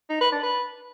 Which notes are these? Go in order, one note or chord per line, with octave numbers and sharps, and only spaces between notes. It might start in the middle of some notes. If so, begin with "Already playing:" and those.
D#4
B4
D4
B4